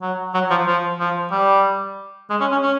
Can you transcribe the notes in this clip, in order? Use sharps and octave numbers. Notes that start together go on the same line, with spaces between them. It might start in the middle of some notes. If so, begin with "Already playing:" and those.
F#3
F#3
F3
F3
F3
G3
G#3
C#4
C#4
C#4